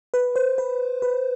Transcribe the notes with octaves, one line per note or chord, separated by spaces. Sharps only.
B4
C5
B4
B4